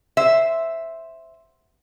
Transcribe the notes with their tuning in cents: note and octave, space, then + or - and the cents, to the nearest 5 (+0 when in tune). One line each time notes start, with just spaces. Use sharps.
C5 +0 E5 +0